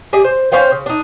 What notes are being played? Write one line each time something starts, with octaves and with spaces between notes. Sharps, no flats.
G4 G#4 D5 D#5
C5
C#4 C5 F5 G5
C#3
D4 D#4